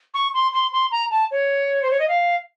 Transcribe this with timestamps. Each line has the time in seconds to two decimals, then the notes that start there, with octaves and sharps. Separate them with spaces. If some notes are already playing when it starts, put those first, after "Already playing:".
0.14 C#6
0.34 C6
0.53 C6
0.72 C6
0.91 A#5
1.11 A5
1.31 C#5
1.83 C5
1.91 C#5
1.99 D#5
2.08 F5